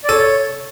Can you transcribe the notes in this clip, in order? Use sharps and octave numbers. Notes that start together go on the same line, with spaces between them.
D5
A4 C#5